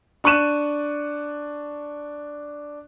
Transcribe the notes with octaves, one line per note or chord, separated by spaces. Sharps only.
D4 C#6 F#6 D#7 E7